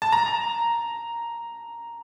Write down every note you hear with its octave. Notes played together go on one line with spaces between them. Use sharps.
A5
A#5